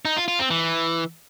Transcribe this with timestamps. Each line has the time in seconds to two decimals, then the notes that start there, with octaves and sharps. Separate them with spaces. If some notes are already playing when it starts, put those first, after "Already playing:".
0.05 D#4
0.17 F4
0.28 F4
0.39 C4
0.51 E3